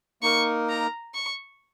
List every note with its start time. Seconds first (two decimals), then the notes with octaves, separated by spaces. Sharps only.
0.22 A#3 D#4 A#4 C#6
0.69 A#5
1.14 C#6